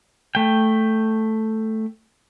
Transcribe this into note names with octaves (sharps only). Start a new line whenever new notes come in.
A3 G5